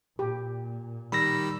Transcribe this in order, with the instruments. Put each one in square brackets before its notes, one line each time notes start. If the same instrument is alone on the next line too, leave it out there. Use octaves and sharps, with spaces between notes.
[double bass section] A#2 [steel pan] G4
[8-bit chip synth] D#3 G3 E6 [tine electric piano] B5 A#6